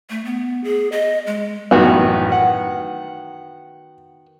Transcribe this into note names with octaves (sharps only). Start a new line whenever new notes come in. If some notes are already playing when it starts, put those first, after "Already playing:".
A3
B3
G#4
D#5
G#3
A1 F#2 D#3 B3 F#4
F#5